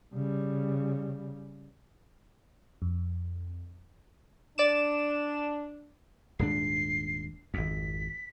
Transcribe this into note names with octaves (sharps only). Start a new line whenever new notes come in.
C#3 G3
F2
D4 D5 D6 E7
D#1 G#2 D4 C7
G#1 F2 B6